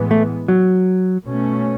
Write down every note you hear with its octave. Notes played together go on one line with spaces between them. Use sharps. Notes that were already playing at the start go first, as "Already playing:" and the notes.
Already playing: A2 E3 G#3 B3
A3
F#3
B2 A3 C#4